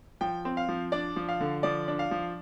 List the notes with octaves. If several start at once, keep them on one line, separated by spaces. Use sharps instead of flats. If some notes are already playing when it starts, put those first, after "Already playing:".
F3 G5
C4
F5
F3
D4 D5
F3
F5
D3
F3 D5
D4
F5
F3